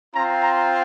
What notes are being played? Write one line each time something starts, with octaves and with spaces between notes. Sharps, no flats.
C4 F4 A#5
A#5